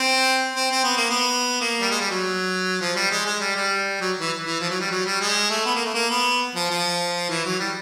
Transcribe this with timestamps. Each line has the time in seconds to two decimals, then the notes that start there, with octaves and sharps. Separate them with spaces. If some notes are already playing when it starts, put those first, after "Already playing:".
Already playing: C4
0.56 C4
0.71 C4
0.84 B3
0.97 A#3
1.10 B3
1.61 A#3
1.81 G3
1.91 G#3
2.01 G3
2.10 F#3
2.81 F3
2.96 G3
3.11 G#3
3.26 G#3
3.40 G3
3.56 G3
4.01 F#3
4.21 E3
4.45 E3
4.61 F3
4.70 F#3
4.80 G3
4.91 F#3
5.05 G3
5.21 G#3
5.51 A3
5.65 B3
5.75 A#3
5.85 A3
5.94 A#3
6.11 B3
6.55 F3
6.70 F3
7.30 E3
7.45 F#3
7.60 G3